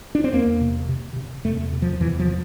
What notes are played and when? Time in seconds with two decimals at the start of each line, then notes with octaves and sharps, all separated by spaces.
0.15 D4
0.24 C4
0.32 E2 A#3
0.61 C3
0.89 C3
1.16 C3
1.44 E2 A3
1.73 C3
1.82 F3
2.00 E2 E3
2.20 F3